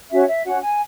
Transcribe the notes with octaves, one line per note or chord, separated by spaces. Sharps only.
C#4 F#4 C#5 E5
E5
C#4 F#4 C#5 F#5
G#5